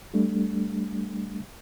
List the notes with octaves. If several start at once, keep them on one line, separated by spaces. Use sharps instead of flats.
G3 A3 D4